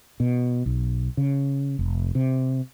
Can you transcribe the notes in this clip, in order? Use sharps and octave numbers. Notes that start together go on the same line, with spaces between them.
B2
B1
C#3
F1
C3